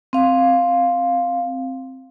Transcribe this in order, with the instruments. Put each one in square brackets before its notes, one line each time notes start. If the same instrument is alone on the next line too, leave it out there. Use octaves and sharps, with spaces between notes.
[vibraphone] C4 F5